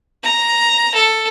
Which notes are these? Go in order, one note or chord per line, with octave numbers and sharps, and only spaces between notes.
A#5
A4